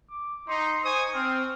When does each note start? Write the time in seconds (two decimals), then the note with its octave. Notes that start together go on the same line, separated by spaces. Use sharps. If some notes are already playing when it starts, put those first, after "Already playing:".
0.11 D6
0.49 D#4 C6
0.85 C5 G#5 C#6 D#6
1.15 C4 F6